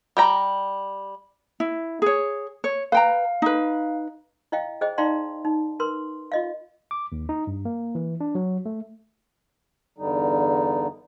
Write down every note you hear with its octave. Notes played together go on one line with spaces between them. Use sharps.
G3 G5 A#5
E4
G#4 C#5
C#5
B4 F5 G5 A#5
D#4 B4
E4 D#5 F5 G5
G#4 C5 D#5 G5
D#4 D5 F5 G5 A#5 C6
D#4
A#4 B4 C6
F4 D#5 F5
D6
D#2
D#4
G2
A#3
E3
D4
F#3
A3
E2 G2 D3 G3 D#4